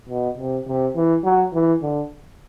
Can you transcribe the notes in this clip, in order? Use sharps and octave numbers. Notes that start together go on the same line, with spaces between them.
B2
C3
C3
E3
F#3
E3
D3